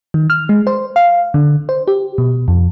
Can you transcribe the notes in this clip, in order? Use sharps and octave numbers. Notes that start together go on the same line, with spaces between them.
D#3
F6
G#3
C5
F5
D3
C5
G4
B2
F2